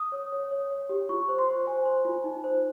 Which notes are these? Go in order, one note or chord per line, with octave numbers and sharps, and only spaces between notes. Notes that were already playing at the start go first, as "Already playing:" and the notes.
Already playing: D#6
C#5
C#5
C#5
C#5
G4
F4 C#6
C5
C6
C5
C5 G#5
C5
F4
D#4
C5